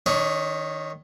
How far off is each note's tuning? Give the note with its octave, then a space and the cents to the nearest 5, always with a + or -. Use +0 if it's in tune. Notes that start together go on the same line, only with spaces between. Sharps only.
D#3 +0 D4 -40 C#5 +0